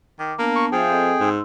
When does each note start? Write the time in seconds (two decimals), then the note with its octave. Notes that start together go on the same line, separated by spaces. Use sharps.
0.19 D#3 D6
0.39 A#3 B3 D4 A5
0.56 C#6
0.72 F3 G#4 E5 F5 G5 D#6
0.89 C4 A4 D#5
1.20 G#2 D#4 C6 E6